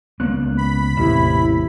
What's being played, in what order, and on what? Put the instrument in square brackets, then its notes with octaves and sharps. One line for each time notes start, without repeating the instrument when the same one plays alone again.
[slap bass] C#2 A#3 B3 [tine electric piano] F#6
[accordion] B5
[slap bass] A1 [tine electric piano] E2 C3 [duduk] E4